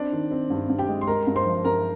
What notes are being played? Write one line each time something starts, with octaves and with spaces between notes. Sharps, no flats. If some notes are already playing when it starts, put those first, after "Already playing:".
Already playing: C4 D4 D5
D#3
C4
G2
G2
G4 G5
G#3
C6
G#3 A#4 A#5
G2
C5 C6
F3
G2 A#4 A#5